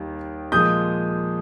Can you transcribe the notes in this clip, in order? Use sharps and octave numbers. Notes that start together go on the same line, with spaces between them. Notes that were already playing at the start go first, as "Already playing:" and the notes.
Already playing: D#2 D#3 G3
A#2 F3 G#3 D#6 G6